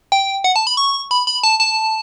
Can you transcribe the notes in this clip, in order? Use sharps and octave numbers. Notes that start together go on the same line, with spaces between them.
G5
F#5
A5
B5
C#6
B5
B5
A5
A5